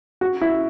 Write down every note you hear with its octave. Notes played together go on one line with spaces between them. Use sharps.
F#4
E4